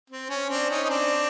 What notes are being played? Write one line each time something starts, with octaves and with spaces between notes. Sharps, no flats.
C4
C#4
C4 D4
C#4 D#4
D#4
C4 D4